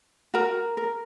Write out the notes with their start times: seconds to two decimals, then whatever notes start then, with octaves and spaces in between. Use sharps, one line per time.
0.34 F#4 A#4 A#5
0.77 A#4